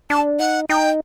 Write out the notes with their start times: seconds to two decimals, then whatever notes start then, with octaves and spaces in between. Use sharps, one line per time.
0.10 D4 A5
0.39 D#4 F#5
0.69 D#4 G5